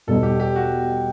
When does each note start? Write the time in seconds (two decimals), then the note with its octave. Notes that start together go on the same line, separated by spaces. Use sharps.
0.07 E2 B2 G3 D#4 A4
0.23 G4
0.40 G4
0.56 F#4